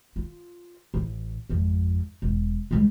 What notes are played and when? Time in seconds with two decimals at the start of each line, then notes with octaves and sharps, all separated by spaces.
0.16 F4
0.94 A1
1.49 G#1 F2
2.22 E1
2.71 C#2 G3